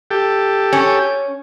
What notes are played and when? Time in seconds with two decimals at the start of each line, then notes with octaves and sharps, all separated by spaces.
0.11 G4 A4
0.73 C#4